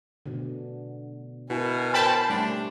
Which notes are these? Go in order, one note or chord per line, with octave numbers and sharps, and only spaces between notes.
B2 D3
B2 E4 A#4 G#5
C5 C#5 G5 A5 B5
G3 A3 D4